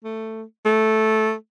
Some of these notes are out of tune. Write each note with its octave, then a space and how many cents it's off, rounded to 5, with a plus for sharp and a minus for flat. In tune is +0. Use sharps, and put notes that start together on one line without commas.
A3 +10
A3 -10